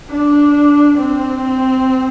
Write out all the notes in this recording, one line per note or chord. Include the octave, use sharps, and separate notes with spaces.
D4
C4